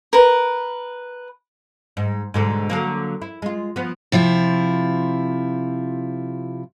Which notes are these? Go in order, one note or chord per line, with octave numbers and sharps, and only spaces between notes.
A#4 B4
G#2
G#2 B2 D3
D3 F#3 A#3
E4
G#3 F4
F3 B3
C3 F3 E4 F4